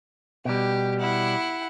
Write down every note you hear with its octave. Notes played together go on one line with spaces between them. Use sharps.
B2 G3 G4
E4 F#5